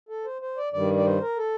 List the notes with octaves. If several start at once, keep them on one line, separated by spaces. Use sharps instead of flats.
A4
C5
C5
D5
G2 D#3 G3 D5
D5
C5
A#4
A4